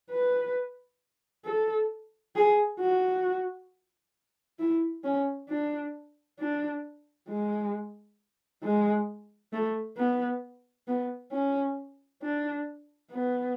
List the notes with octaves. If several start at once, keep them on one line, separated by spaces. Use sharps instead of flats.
B4
A4
G#4
F#4
E4
C#4
D4
D4
G#3
G#3
A3
B3
B3
C#4
D4
B3